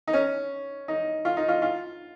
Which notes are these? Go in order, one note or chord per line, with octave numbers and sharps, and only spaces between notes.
D#4
C#4
D#4
F4
D#4
F4
F4